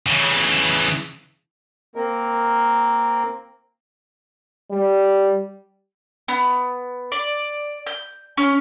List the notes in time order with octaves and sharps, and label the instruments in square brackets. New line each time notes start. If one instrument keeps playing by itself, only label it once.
[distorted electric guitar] C#3 E3
[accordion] A#3 C4 A#4
[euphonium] G3
[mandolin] B3
D5
G6
C#4